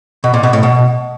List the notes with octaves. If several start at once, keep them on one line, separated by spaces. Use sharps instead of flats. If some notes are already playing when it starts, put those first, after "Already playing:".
B2
A#2
B2
A2
B2